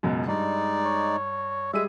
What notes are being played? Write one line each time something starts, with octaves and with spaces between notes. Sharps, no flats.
C#2 F#2 B2
G2 G#3 D#4 D5
C#5
G3 G#3 G#4 E5 D#7